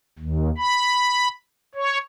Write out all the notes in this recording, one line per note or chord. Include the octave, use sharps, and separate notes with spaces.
D#2
B5
C#5